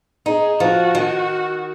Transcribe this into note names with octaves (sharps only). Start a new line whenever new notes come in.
D#4 G#4
F3 F#4
D#3